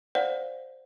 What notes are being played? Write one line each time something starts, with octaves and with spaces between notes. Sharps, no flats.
C5 D5 F5 F#5